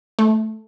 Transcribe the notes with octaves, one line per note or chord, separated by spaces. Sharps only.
A3